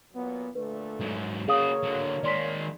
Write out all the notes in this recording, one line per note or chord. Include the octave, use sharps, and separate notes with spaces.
A#2 F#3 B3
A#2 D3 A3 B4
G#2 F#3
C#3 A#3 F#4 G#4 C#5 F5 D#6
D3 F#3
D#3 G#3 D5 C6 B6